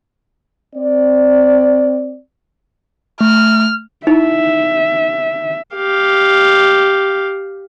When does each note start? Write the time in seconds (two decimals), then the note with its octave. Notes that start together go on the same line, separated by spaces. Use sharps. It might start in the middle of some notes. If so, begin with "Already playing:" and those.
0.75 C4 D5
3.21 A3 F6
4.07 D#4 E4 E5
5.76 G4 F5